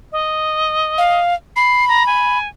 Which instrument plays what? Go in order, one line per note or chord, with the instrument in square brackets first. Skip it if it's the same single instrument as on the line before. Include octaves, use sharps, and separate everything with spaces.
[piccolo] D#5
[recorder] F5
[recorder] B5 [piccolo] C7
[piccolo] A#5
G#5